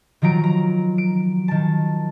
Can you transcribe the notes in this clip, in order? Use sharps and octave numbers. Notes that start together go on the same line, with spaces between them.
D#3 F3 F#3 A#5 D7
A#5
D7
D#3 A5